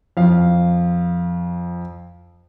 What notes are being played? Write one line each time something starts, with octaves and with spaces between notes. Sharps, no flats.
F2 F5